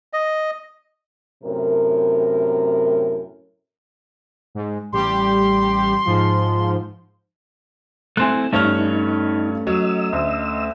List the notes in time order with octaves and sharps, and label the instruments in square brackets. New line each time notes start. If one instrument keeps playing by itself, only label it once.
[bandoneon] D#5
[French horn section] F#2 A2 C3 A#4
[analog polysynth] G#2
[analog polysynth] A1 G3 G4 [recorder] C6
[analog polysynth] G#2 F3
[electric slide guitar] A3 C4 E4 [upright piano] G#5 C6 F#6
[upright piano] G2 C#5 F6 [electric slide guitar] A3 C#4 [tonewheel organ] D#4
[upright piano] F#3 [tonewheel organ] D#5 E6
[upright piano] D2